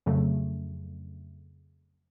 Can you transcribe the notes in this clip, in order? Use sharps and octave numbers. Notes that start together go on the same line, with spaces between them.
F2 C#3 F#3 A3